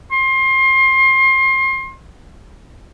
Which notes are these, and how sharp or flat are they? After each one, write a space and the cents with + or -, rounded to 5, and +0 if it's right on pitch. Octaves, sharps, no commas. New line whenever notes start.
C6 +30